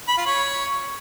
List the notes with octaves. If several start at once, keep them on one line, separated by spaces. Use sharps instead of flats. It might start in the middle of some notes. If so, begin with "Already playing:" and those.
B5
F4
C#5